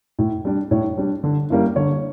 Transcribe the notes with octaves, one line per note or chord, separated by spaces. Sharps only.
A2
G3 D4
A2 C#5
G3 D4
D3
G3 A#3 C#4 E4
D3 C#5